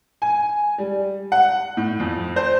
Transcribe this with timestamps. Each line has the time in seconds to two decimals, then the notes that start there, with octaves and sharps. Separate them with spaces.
0.22 G#5
0.78 G3
1.32 F#5
1.77 A2
2.00 F2
2.36 C5